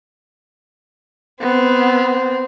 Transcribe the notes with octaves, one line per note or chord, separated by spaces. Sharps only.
B3 C4